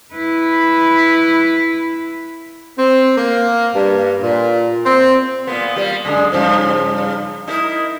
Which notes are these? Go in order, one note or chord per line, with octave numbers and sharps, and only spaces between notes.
E4 B4
C4
A#3
G2
A#2
C4
A#2 A#3 B3
G3 A#3
F#2 D3 G#3
G2 C#3 F3
D#4 E4 A#4